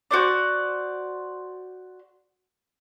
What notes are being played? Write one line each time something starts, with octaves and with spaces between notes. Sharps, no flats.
F#4 C5 D5